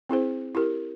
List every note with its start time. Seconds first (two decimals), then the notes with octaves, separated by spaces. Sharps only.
0.09 C4 E4 G#4 C5
0.55 E4 G4 A#4